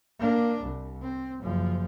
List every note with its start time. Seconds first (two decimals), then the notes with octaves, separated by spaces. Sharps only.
0.19 A#3 D4
0.62 C2
1.02 C4
1.43 F#1 F3